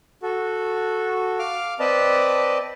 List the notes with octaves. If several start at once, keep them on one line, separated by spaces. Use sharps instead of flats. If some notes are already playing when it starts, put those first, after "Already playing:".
F#4 A4
F5 D6 F6
C4 B4 D5 D#5 A5